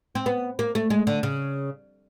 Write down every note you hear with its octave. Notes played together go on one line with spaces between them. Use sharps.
C4
B3
A#3
A3
G#3
D3
C#3